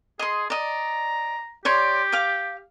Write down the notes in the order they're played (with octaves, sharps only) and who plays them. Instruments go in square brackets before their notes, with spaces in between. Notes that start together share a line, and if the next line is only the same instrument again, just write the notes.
[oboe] G#4 [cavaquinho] D#5 C6
[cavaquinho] D5 D#5 [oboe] A#5
[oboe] G4 [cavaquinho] C#5 D5 C6
[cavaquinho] F5 D6